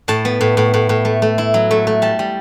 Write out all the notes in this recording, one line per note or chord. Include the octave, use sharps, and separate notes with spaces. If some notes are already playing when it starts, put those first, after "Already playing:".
A2 A5
B3
A2
A2
A2
A2
A3
A3
E4
F#3
A3
A3
G3 A5
G3